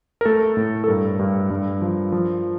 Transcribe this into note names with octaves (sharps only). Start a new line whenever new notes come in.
A#4
A3 A4
A2
A4
G2 A#4
G2
G2
F3
F3